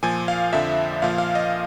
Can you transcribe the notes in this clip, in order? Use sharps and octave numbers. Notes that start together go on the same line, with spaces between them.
A#2 F3 G#5
F5
F2 D3 F3 E5
A#2 F3 F5
F5
D#5